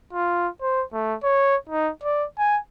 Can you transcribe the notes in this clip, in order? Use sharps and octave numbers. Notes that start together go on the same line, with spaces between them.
F4
C5
A3
C#5
D#4
D5
G#5